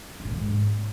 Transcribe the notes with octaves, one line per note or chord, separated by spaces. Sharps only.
F#2
A2
D#3
G#2